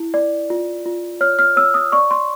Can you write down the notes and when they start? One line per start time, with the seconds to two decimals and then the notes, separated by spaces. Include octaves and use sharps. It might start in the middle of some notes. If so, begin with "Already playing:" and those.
Already playing: E4
0.14 D5
0.50 F4
0.86 F4
1.21 C#5 F6
1.39 F6
1.56 C#5 E6
1.74 D#6
1.92 D5 C#6
2.11 C6